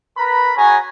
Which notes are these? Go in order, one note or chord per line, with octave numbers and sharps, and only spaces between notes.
A#4 B4 A#5 B5
C#4 F#4 G#4 C#5 G#5 A#5